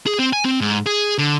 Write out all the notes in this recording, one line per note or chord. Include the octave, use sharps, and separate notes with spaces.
G#4
C4
G#5
C4
G#2
G#4
D3